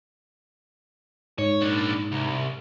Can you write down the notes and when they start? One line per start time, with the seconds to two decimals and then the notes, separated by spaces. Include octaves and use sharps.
1.39 G#2 C#5
1.62 A#2 D4
2.12 C2